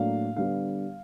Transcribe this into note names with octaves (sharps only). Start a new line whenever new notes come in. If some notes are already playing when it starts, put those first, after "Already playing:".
Already playing: A2 F#3 A#3 D4 F5
D3 G3 B3 F5